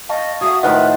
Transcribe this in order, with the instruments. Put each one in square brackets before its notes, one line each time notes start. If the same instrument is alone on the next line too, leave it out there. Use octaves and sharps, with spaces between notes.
[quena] D#5 [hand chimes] F5 A5 C#6
[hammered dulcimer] F#3 F#4 E5 [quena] D#6
[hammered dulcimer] A2 D#3 F3 [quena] B4 [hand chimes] D#5 F#5